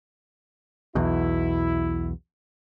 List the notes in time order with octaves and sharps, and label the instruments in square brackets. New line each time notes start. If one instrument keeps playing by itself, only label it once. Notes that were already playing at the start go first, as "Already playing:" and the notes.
[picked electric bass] B1 E2 B2 [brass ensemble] E4